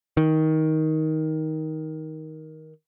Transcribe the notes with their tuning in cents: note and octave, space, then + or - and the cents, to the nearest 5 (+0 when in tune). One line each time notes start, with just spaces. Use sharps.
D#3 +15